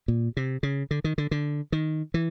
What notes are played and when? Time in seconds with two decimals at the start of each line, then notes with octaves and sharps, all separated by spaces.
0.08 A#2
0.37 C3
0.63 C#3
0.91 D3
1.04 D#3
1.18 D3
1.31 D3
1.72 D#3
2.14 E3